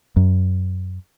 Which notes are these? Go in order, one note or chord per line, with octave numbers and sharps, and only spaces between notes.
F#2